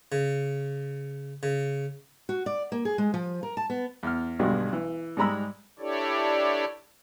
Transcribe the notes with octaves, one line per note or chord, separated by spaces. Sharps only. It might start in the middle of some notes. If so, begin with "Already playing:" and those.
C#3
C#3
F#4
D5
A#3
G#4
G#3
F3
A#4
A5
B3
E2 F6
B1 G2 B2 D3 G3 G#3
E3
G#2 G3 G#3 A#5 B5 E6
D4 E4 G4 A4 C#5 D5